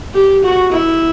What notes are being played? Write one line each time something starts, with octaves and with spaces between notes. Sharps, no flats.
G4
F#4
E4